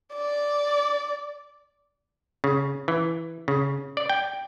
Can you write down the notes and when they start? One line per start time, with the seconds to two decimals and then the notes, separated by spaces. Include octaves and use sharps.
0.14 D5
2.44 C#3
2.88 E3
3.48 C#3
3.97 D5
4.10 G5